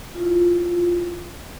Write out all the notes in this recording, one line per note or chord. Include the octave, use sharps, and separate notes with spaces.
E4 F4